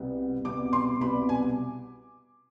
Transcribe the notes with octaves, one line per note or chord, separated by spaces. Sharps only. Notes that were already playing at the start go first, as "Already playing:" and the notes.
Already playing: C2 B2 B3
C2 B2 B3 D6
C6
C2 B2 B3 B5
G#5